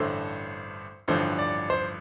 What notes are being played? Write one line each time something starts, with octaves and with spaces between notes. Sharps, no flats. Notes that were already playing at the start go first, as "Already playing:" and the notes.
Already playing: A1 G2 D3 A3 C5
A1 G2 D3 F3 C5
D5
C5